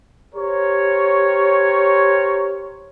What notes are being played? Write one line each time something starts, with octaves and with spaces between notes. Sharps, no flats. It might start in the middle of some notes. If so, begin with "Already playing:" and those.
G4 A#4 C5 C#5